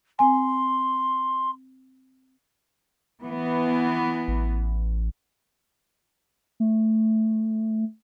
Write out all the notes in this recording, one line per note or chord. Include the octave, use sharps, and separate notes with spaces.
C4 G#5 C6
E3 B3
A1
A3